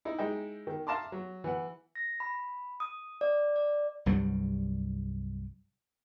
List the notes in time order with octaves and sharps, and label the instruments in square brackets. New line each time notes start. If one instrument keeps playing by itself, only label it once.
[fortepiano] D#4 E4
G#3 D#4 E4 E5 G5
D#3
E5 F5 A5 A#5 C6 D6
F#3
E3 F#5
[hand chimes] A#6
B5
D#6
D5
D5
[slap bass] C2 G2 F#3 G3